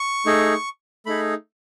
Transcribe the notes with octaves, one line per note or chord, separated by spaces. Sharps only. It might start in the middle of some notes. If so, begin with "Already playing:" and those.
Already playing: C#6
A3 D#4 G#4
A3 D#4 G#4 B5